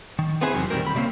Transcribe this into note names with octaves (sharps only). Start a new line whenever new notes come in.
D#3
B3 C4 E4 G#4 B4 C5
E2 C3 D#3 F#3
B2 D#3 G3 A#3 C4 A#4
D2 B5
C3 G3 A#3 C4 C#4